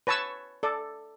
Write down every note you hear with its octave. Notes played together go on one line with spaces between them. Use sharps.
B4 C#5 A5 C#6 E6
A4 D5